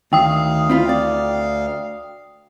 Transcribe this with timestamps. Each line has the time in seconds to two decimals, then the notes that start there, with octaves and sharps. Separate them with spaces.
0.13 D2 D#3 F5 G5 D#6
0.69 C4 E4 F4
0.89 D5